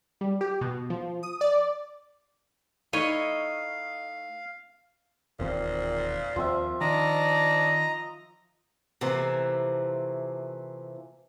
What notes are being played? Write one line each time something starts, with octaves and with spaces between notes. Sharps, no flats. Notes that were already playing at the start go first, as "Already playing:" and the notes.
G3
G4
B2
F3
D#6
D5
A3 D#4 E4 C#5 D#5 F5
E1 D#2 A#2 C4
D#2 F3 C4 E5
D#3 D4 D#5 A#5 B5
C3 E3 F3 A3 A#3